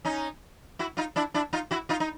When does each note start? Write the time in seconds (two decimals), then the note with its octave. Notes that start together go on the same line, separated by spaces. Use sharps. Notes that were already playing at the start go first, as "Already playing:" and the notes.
0.05 C#4 D#4
0.79 E4 F#4
0.97 D#4 F4
1.16 D4 E4
1.34 D4 E4
1.53 D#4 F4
1.71 E4 F#4
1.89 D#4 F4
2.00 D#4